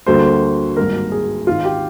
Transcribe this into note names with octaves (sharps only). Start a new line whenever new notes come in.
D2 D3 G3 A#3 C5
G#1 G#2 G3 A#3 A#4
G#4
G#1 G#2 D#3 F4
G4